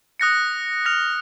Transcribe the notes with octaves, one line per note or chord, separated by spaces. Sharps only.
D#6 F#6 A#6 C#7
F6 A#6 F7